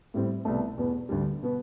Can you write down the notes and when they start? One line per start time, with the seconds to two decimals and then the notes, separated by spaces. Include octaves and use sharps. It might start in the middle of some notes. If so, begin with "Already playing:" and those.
0.14 A2 G3 C4
0.45 C2 B2 A3
0.78 E2 B2 B3
1.09 D2 D3 G3
1.43 B2 B3